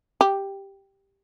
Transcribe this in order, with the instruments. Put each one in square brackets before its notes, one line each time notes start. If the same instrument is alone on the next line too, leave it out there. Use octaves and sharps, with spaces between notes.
[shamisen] G4